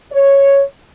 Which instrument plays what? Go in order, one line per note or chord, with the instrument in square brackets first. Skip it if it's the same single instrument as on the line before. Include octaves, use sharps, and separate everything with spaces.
[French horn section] C#5